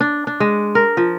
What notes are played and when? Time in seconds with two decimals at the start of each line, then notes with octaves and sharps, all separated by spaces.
0.01 D4
0.27 D4
0.40 G#3
0.75 A#4
0.97 F3